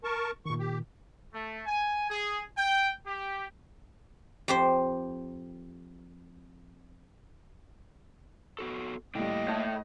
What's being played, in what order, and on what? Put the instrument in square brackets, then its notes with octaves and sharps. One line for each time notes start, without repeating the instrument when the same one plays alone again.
[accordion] A#4 A5 C#6
[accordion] E2 C#6 [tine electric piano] A#2 D#3
[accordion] G4
[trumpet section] A3
G#5
G#4
G5
G4
[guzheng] F2 G4 C5
[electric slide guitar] B3 F#4 A4
[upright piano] A2 G3 [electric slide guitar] A#3 D4 G5 [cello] D#5
[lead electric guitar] A2 [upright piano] A5